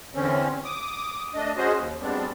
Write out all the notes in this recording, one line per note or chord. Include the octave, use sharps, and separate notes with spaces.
E2 D3 C4 C#4
D6 D#6
A3 D4 D#5
C#4 F#4 G#4 C5 D#5
D#2
F#2 G3 G#3 B3 C4 D4